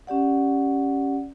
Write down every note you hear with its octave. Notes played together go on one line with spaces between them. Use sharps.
C#4 G4 D5 F#5